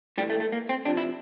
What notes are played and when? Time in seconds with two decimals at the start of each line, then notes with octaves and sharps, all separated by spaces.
0.18 A2 G3
0.21 E3
0.30 A3
0.40 A3
0.52 A#3
0.69 C4
0.85 C3 F3 D4
0.97 E4